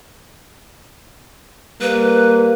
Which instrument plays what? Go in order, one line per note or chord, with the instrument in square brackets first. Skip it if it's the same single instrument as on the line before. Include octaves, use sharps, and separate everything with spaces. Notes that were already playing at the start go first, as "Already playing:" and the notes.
[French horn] G3 [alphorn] A#3 [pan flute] B4